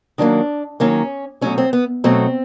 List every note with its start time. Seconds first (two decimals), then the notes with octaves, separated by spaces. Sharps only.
0.18 D#3 F#3 A#3 D4
0.80 D#3 F#3 A#3 C#4
1.41 B2 F#3 A3 C#4
1.58 C4
1.73 B3
2.04 B2 F#3 A3 C4